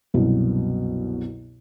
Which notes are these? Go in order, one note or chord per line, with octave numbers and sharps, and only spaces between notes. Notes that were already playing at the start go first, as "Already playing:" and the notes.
C2 F#2 B2